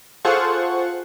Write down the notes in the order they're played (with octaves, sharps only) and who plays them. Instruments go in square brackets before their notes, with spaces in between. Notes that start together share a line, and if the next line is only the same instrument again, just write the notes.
[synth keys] F4 G#4 A4 C5 F#5 C#6